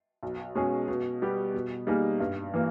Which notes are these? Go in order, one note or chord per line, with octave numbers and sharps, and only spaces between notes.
B1
B2 G#3 C#4 G#4
B2
G3 B3 G4
B2
G3 A#3 D#4 G#4
G2
E3 A#3